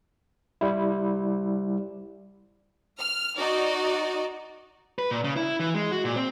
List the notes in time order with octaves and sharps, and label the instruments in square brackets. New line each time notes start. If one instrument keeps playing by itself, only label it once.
[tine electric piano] G3 E4
[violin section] F6
D#4 F#4 D5
[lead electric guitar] B4
A#2
C#3
E4
E3
G#3
F#4
A#2
C4